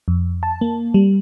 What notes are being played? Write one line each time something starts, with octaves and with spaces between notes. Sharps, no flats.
F2
A5
A#3
G3